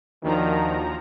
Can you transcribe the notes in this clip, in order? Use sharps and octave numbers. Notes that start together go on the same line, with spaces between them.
D#2 D#3 F3 A#3 D4 F#4 A#5